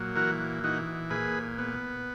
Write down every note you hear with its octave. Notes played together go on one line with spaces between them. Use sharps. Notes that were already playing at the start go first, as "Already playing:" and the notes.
Already playing: A#2 F#3
E3 F#4 A#4
E3 D#4 F#4
A#2 G#4 B4
B3